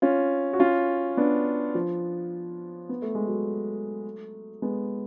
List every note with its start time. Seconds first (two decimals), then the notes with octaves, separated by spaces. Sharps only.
0.02 C#4 F4
0.53 F#4
0.60 C#4 F4
1.17 B3 D4
1.75 F3
2.89 B3
3.02 A3
3.15 G#3
3.27 F#3 A3
4.62 G#3 B3